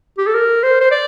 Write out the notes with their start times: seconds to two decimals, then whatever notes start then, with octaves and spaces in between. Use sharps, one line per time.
0.18 G4
0.27 A4
0.34 A#4
0.63 C5
0.81 C5
0.91 D5